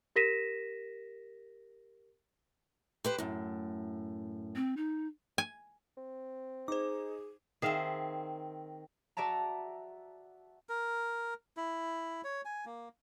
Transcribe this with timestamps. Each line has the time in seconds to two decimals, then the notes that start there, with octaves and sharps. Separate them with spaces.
0.16 G4 A#4 A#6 B6 D#7 E7
3.04 G4 B4 C5
3.18 F#2 A2
4.55 C4
4.77 D#4
5.38 G#5
5.97 C4
6.68 D#4 G#4 C5 D6
7.62 D#3 C4 G#4 E5 F5
9.17 F#4 D5 E5 A5 A#5
10.69 A#4
11.57 E4
12.24 C#5
12.45 G#5
12.66 A#3